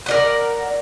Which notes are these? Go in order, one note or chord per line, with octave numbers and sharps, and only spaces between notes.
A#4 D5 F#5